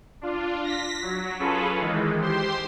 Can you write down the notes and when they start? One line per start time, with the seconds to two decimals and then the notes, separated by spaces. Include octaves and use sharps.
0.21 D4 F4
0.64 A#6 B6
1.02 F#3
1.39 C#4 F4 G#4 A4 B4
1.82 D#3 E3 G#3
2.21 G4 C5 C6